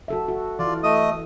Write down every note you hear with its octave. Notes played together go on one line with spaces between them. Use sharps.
F#4 A4 E5
F#4
E3 F4 D5
A3 D#5 D#6